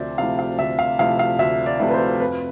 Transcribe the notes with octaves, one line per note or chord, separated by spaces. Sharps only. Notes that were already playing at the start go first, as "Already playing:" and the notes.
Already playing: D2 C3 F3 A3 C5 D5 E5
C3 F3 A3 E4 F5
F5
D2 E5
F5
C3 F3 A3 E4 F5
F5
D2 E5
D5
C3 F3 A3 E4
B4
C5
F2 B4